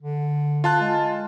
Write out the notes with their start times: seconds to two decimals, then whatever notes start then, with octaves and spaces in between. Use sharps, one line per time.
0.01 D3
0.64 F4 A5 F#6
0.80 G#3